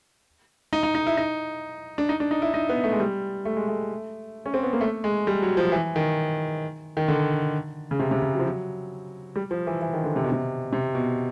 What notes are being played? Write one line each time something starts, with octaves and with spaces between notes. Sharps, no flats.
D#4
D#4
D#4
E4
D#4
D4
D#4
D4
D#4
E4
D#4
B3
A3
G#3
G3
A3
G#3
A3
C#4
C4
B3
A#3
A3
G#3
G3
F#3
F3
E3
D#3
D#3
D3
C#3
C3
C3
C#3
F#3
F3
F#3
G3
F3
E3
E3
D#3
D3
C3
B2
C3
C3
B2